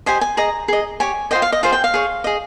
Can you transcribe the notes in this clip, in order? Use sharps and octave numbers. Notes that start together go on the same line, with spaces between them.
G4 C5 D#5 G#5
G#5
G#4 D#5 A#5
G#4 D#5
G4 C#5 G#5
F4 C5 D#5 G5
F5
D#5
F4 G#4 C5 F5
G5
F5
G#4 C#5
G#4 D#5